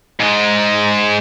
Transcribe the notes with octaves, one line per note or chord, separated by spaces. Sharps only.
G#2 G#3